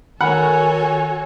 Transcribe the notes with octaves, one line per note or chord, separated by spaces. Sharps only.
D#3 F#4 A4 C#5 F#5 G#5 B5